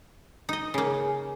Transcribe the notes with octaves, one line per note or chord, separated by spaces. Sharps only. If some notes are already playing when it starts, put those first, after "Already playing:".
D#4 D#5
C#3 A#3 G#4